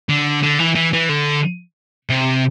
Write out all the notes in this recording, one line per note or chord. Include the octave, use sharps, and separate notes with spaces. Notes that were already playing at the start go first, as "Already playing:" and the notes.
D3
D3
E3
E3
E3
D3
C3